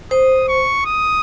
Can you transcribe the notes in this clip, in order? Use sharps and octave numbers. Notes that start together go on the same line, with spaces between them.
C5 D#6
C#6
D#6